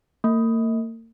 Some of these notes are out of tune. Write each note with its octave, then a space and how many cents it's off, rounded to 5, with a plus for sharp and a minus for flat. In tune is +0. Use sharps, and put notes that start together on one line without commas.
A#3 -45